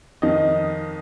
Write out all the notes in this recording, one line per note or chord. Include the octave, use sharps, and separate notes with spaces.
F2 D#3 D#5